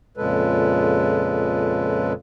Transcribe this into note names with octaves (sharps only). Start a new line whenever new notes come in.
F2 A#2 C#3 G#3 A4 B4